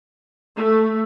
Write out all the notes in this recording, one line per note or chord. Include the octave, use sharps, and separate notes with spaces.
A3